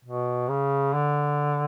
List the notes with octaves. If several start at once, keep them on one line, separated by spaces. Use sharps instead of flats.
B2
C#3
D3